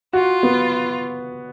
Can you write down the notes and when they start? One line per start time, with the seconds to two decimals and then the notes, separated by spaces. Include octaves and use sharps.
0.13 F4 F#4
0.43 B3